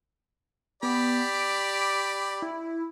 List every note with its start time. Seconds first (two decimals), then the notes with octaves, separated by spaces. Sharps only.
0.83 B3 G4 D5 B5
1.35 D7
2.42 E4